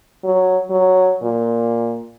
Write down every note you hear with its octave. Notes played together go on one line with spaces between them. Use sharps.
F#3
F#3
A#2